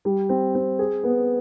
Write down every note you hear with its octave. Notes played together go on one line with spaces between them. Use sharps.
G3
C4
C4
G#4
B3